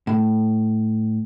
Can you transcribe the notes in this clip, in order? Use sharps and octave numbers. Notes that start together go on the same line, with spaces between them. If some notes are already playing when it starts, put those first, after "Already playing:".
A2